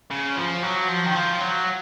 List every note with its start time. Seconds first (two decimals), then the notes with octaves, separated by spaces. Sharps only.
0.10 C#3
0.36 F3
0.62 F#3
0.88 F3
1.06 D#3
1.14 F3
1.40 F#3